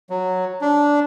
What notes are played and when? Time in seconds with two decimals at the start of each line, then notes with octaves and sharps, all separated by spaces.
0.10 F#3
0.61 D4